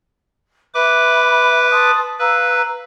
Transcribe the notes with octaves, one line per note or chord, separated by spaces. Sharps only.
B4 E5 B5 D6
A5 C6 D#6
B4 F5 A#5 E6